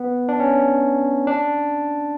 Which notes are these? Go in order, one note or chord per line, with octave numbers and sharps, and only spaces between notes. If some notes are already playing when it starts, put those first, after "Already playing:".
Already playing: B3
D4
C#4
D4